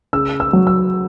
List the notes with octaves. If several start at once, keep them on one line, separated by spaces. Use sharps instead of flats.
C#3 E6
E6
F#3
E6